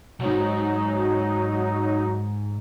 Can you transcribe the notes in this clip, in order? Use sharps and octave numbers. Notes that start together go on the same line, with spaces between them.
B1 G#2 F#3 D#4